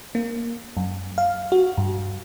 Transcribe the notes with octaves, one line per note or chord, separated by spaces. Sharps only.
A#3
F#2
F5
F#4
G2